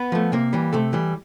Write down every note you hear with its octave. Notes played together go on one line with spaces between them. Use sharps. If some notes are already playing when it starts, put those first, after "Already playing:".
Already playing: B3 B4
F3 A3
C3 A#3 A#4
E3 G3
C3 A3 A4
E3 G3